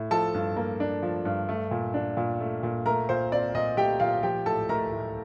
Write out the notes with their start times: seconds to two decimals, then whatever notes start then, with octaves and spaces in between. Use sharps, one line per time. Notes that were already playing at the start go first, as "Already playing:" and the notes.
Already playing: A2
0.11 F3 A4 A5
0.34 G2
0.56 A#3
0.80 D4
1.03 F3
1.25 G2
1.49 A3
1.71 A#2
1.94 D4
2.17 A#2
2.40 A3
2.63 A#2
2.86 A3 A#4 A#5
3.09 A#2 C5 C6
3.32 C4 D5
3.54 A#2 D#5
3.77 A3 G4 G5
4.00 A#2 F4 F5
4.23 F3 G4 G5
4.46 A2 A4 A5
4.69 A3 A#4 A#5
4.92 A2